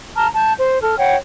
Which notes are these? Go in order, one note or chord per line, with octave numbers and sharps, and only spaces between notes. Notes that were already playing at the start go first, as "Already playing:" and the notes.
A5 A#5 F6
A5 G6
C5
A4 F6
C#5 F#5 G5